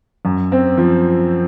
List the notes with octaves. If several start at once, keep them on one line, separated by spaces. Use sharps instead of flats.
F#2
C4
F3